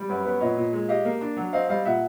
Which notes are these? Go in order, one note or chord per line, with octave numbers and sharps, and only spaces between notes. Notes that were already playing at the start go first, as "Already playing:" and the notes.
Already playing: G3
F#2 B4 C#5
B3 B4 C#5
A#2 C#5 D#5
A#2
G#3
G4 D#5 F5
A#3
D4
F#3
C4 D#5 F5
G3 D#5 F5
A#2 E5 F#5